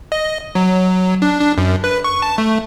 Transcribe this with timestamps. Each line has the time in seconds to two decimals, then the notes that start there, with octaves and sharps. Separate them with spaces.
0.12 D#5
0.55 F#3
1.22 D4
1.40 D4
1.58 F#2
1.84 B4
2.04 C#6
2.22 A5
2.38 A3